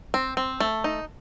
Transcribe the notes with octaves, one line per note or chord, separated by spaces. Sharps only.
C4
C4
A3
D#4